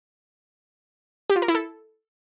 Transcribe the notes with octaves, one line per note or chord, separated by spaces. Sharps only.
G4
F4
A#4
E4
A4